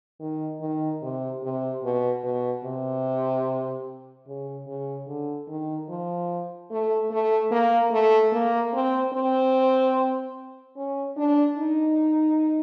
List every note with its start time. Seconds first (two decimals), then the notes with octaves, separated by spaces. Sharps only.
0.20 D#3
0.61 D#3
1.02 C3
1.43 C3
1.83 B2
2.24 B2
2.64 C3
4.27 C#3
4.67 C#3
5.07 D3
5.48 D#3
5.89 F3
6.71 A3
7.11 A3
7.51 A#3
7.91 A3
8.32 A#3
8.73 C4
9.13 C4
10.77 C#4
11.16 D4
11.57 D#4